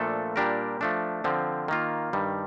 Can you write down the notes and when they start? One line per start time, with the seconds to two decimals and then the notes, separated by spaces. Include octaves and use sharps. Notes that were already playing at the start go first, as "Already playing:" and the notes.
Already playing: A#2 F3 A3 D4 A4
0.36 A#2 G3 D4 G4 A#4
0.81 F3 A3 D4
1.24 D3 F3 C4
1.68 D#3 A#3 F4
2.13 G2 D#3 G3